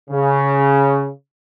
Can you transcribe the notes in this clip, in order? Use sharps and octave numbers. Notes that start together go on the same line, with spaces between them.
C#3